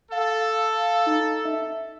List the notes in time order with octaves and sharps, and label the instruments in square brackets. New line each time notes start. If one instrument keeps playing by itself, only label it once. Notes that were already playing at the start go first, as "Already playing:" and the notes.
[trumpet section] A4 [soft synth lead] F5
[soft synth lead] D#4
E5